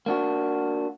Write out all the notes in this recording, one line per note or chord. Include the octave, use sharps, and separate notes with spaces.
A#3 D4 F#4